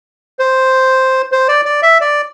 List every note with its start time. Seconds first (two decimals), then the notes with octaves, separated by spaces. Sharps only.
0.39 C5
1.32 C5
1.48 D5
1.65 D5
1.83 E5
2.01 D5